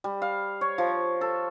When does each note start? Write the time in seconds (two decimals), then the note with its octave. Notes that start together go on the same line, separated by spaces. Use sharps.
0.04 G3
0.22 F5
0.61 C#5
0.78 F3
1.21 A4